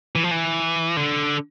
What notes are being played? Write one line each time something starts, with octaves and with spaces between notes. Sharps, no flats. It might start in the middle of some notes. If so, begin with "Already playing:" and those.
E3
F3
E3
D3